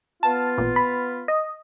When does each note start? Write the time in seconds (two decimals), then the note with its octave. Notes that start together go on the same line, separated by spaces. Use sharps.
0.23 B3 F4 A5
0.58 A1 A#2
0.76 B5
1.28 D#5